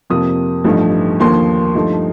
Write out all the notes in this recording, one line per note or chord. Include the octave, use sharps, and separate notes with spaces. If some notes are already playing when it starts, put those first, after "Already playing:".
F2 C3 F3 A#3 D#6
A1 G2 F3 A3 D#4
D#2 D3 F3 A#3 C6
G2 F3 A3 D#4